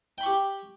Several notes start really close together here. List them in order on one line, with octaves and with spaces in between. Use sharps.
G5 B5 C#6 G4